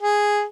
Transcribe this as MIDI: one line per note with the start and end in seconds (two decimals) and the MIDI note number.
0.01 0.44 68